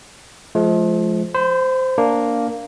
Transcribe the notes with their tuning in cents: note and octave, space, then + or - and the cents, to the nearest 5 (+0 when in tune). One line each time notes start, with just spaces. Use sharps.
F3 +0 G#3 +45
C5 -10 B5 +40
A#3 +0 D4 -10